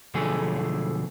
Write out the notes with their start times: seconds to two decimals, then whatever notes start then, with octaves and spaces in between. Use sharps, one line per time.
0.14 B1 D3 F3 A3 G#4